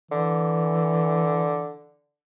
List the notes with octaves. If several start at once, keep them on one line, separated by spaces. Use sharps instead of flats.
D3 E3